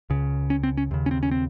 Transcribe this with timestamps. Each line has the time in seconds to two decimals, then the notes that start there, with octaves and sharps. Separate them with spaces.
0.10 C#2 C#3
0.50 C#4
0.63 C4
0.77 C#4
0.91 D#2 C#3
1.06 C#4
1.11 C4
1.23 C#4
1.31 C4